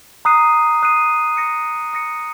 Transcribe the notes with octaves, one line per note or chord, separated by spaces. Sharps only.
A#5 D#6 F#6 C7 D#7
A#5 D#6 F#6 C7 D#7
D#6 A#6 C#7
D#6 A#6 C#7